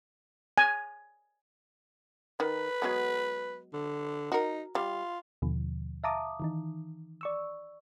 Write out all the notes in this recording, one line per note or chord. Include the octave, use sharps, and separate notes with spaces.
G#5
D#3 B4
F#3 G#3 B3
D3
D#4 F#4 A#4
G3 F4
D#2 B2 D3 F3
E5 F5 A5 A#5 D6 D#6
D#3 E3 D#4
D5 C#6 E6